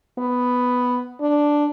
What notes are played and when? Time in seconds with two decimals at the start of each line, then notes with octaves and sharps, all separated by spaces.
0.19 B3
1.21 D4